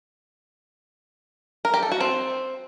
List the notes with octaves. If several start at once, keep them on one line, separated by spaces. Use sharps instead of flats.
A#4
G4
A4
F#4
C4